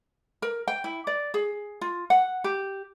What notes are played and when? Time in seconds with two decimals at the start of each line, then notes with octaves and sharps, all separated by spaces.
0.42 A#4
0.68 G5
0.84 E4
1.07 D5
1.34 G#4
1.81 F4
2.10 F#5
2.44 G4